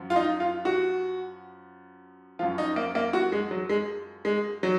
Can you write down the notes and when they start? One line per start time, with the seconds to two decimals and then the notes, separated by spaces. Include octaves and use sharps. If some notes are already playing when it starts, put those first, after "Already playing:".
Already playing: F#2 F3
0.10 F4
0.16 D#4
0.40 F4
0.65 F#4
2.39 F#2 F3 F4
2.58 D#4
2.76 A#3
2.95 A#3
3.13 F#4
3.32 G#3
3.51 F#3
3.69 G#3
4.25 G#3
4.63 F#3